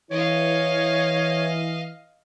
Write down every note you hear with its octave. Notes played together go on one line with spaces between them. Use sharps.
E3 C#5 D#5 F5